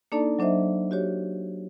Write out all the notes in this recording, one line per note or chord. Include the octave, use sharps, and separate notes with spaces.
A#3 D4 D#4 A4 D5 A5
F#3 D4 C5 D#5 E5
F#4 G4 C#5